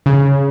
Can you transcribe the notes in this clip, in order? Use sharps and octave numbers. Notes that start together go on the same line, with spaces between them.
C#3